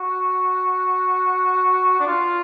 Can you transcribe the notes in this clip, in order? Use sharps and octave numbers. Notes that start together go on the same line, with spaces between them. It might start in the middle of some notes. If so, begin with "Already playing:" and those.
Already playing: F#4
D4
F4